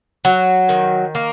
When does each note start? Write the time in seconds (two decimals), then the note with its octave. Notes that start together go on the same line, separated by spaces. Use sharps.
0.25 F#3
0.69 D#3
1.15 A#3